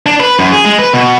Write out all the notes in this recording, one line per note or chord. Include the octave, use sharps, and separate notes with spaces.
D4
B4
F#2
G#4
G#3
B4
B2